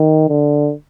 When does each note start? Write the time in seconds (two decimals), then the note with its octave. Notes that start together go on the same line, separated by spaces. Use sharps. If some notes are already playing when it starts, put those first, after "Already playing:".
Already playing: D#3
0.29 D3